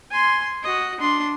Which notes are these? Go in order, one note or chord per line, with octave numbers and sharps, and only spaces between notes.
G#5 C6
F#4 D#5
D4 C6